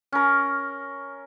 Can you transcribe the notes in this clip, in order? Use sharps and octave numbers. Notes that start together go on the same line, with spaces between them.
C#4 A#4